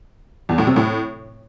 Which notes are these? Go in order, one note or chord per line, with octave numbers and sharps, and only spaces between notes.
E2
A2
C3
A2